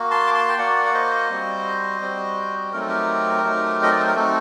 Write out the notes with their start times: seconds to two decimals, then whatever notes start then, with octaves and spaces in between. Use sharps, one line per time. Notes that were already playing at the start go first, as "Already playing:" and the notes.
Already playing: A#3 F#4
0.11 A5 C6
0.27 D6
0.34 A5 C6
0.49 G5
0.58 A#3 F#4 D5 F#5
0.86 F#5
0.94 C5 D#5
1.30 G3 C4 F#4
2.01 G3 C4 F#4
2.72 F#3 A3 C4 D#4 A#4
2.81 A4
2.88 G4 A#4
3.44 F#3 A3 C4 D#4
3.83 D#5
3.91 D5
3.99 C5
4.07 A#4
4.15 A3 C4 D#4 F#4 A4